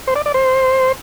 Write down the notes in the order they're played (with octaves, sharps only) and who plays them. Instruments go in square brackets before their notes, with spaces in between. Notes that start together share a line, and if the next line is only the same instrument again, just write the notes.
[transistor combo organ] C5
D5
D5
C5